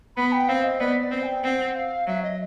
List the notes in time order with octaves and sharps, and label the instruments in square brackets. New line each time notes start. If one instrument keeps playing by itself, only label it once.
[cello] B3 [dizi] B5
[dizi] G5
[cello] C4 [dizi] F5
[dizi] D#5
[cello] B3 [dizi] D5
[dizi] D5
[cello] C4
[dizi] G#5
G5
[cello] C4 [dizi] F#5 G5
[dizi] F5
[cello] F#3 [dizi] E5
[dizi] D#5